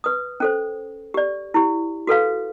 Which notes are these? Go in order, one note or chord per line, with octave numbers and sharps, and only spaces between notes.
B4 D#6
C#4 A4 C5
G4 D5
E4 G4
F#4 A4 B4 F5